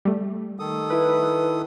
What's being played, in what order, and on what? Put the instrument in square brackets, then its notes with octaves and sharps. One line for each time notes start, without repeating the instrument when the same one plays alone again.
[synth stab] G3 A3
[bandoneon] D#3 A4 D#6
[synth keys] E4 B4